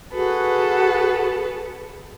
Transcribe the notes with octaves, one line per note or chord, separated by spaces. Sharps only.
F#4 G#4 A4 B4